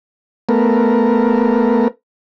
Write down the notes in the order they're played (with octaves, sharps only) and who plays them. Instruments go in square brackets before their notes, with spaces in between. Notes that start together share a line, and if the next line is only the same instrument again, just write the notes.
[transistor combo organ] A3 B3 A#4